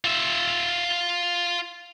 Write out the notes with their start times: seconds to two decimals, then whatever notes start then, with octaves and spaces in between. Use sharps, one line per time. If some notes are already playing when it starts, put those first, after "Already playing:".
0.05 F4 E5